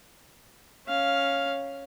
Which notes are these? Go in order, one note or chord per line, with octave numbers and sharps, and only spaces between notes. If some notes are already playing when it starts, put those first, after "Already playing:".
C#4 F5